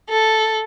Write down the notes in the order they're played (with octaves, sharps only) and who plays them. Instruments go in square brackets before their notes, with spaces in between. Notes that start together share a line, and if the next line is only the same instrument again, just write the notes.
[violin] A4